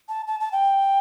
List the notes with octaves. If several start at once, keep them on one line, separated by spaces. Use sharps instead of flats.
A5
A5
A5
G5